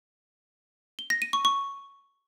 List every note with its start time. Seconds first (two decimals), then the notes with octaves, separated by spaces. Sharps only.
0.99 G7
1.10 A#6
1.22 D#7
1.33 C#6
1.45 C#6